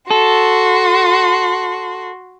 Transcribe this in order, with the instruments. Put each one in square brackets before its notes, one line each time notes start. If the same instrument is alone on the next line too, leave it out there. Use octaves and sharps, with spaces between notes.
[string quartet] F#4 C6 [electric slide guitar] A4